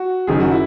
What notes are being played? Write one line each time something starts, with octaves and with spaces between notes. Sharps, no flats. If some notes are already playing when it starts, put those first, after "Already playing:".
Already playing: F#4
F#1 F#2 D#3 G#4
F#4
E4